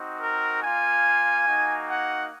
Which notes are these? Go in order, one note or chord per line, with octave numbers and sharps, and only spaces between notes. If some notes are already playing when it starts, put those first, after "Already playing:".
Already playing: C4 D#4 F#4
A#4
A#3 F4 G#5
A#3 D#4 F#4
F#5